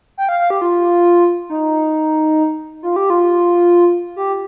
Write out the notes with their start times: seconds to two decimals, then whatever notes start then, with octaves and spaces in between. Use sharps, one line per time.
0.18 G5
0.29 F5
0.40 F5
0.50 G4
0.62 F4
1.50 D#4
2.83 F4
2.96 G4
3.10 F4
4.16 G4